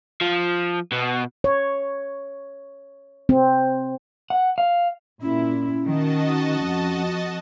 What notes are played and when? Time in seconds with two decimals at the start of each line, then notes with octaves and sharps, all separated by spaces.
0.21 F3
0.93 B2
1.44 C#5
3.29 C4
4.30 F#5
4.58 F5
5.22 A#2 C#4 E4
5.86 D#3 F#4 D#5 A5
6.61 F2